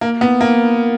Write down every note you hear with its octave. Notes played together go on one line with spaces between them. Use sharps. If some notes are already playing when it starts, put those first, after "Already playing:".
A#3
B3
A#3